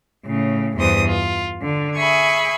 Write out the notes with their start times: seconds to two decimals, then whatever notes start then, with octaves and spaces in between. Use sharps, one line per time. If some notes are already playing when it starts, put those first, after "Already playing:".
0.25 A2 C#3
0.76 E2 G2 C5 D#6
1.07 F4
1.62 D3
1.97 G#4 E5 G#5 B5 C#6